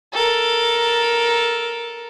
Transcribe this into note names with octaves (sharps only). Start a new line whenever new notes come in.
A4 A#4